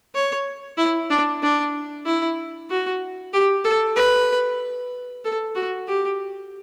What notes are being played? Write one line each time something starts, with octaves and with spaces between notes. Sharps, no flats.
C#5
E4
D4
D4
E4
F#4
G4
A4
B4
A4
F#4
G4